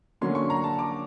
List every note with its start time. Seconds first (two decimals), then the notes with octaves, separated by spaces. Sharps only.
0.21 D3 F#3 A#3 C#4 C6
0.35 C#6
0.50 A#5
0.64 A5
0.79 D6